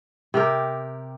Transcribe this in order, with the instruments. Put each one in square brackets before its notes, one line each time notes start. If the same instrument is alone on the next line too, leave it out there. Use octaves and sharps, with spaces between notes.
[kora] C3 G4 A#4